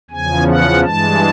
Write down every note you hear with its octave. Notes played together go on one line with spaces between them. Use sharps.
E2 C#3 F3 G#5
F#5
G2 E3 G#3 A5